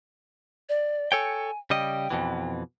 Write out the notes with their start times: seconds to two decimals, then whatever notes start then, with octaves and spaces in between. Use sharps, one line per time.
0.69 D5
1.12 A4 C#5 G5 G#5
1.70 C#3 G3 D#5 G5
2.10 F2 B2 E3